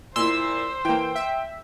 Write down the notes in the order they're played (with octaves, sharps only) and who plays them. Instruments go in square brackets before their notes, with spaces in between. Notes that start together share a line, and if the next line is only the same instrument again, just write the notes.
[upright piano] A#2 E4 [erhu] C5 [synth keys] C6 E6
[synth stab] E3 A#3 [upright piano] G5
[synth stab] E5